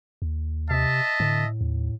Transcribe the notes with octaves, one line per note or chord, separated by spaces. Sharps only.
D#2
C3 D#5 E5 A5
A2 D3
D#2